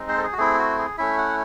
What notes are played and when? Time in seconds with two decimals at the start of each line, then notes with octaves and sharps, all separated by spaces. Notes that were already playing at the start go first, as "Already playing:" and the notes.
Already playing: G#3 C4 D#4
0.08 C5
0.18 A4
0.23 G#4
0.33 F#4
0.38 A3 C4 E4 G#4
0.59 F#4
0.78 G#4
0.98 A3 C#4 E4 E5
1.18 F#5